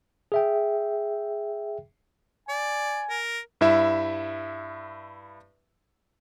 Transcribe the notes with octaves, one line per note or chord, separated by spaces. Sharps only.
G#4 E5 G5
D5 G#5
A#4
G2 E4 E5